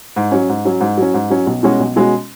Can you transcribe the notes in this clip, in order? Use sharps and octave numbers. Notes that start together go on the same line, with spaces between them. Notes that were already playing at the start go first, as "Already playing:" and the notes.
G#2
F#3 C#4
G#2
F#3 C#4
G#2
F#3 C#4
G#2
F#3 C#4
B1
B2 G#3 C#4 F#4
B1
B2 G#3 C#4 F#4